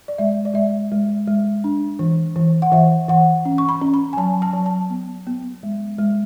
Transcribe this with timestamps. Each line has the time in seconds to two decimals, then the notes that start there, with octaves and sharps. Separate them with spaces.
0.08 D5
0.18 G#3 E5
0.45 D5
0.54 G#3 E5
0.92 G#3
1.27 G#3
1.64 D4
1.99 E3
2.36 E3
2.62 F#5
2.72 E3 E5
3.08 E3 F#5
3.45 C#4
3.58 C#6
3.69 B5
3.81 C#4
3.94 B5
4.13 G#5
4.17 F#3 A5
4.42 A5
4.53 F#3
4.66 A5
4.90 B3
5.27 B3
5.63 G#3
5.98 G#3